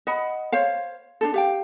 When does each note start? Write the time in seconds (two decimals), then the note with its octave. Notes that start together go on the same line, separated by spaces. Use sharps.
0.07 D#5 F#5 B5
0.52 C5 C#5 F5
1.21 D4 D#4 A4
1.34 G4 F5 G5